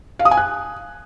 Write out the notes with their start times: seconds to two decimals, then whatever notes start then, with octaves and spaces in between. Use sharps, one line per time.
0.19 F5
0.25 D#6
0.31 G#5
0.37 F#6